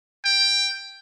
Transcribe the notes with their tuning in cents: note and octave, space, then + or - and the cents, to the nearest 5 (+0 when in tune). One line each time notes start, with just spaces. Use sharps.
G5 +10